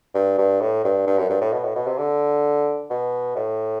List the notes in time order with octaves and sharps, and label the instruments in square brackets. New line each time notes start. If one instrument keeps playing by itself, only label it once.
[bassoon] G2
G2
A2
G2
G2
F#2
G2
A2
B2
A2
B2
C3
D3
B2
A2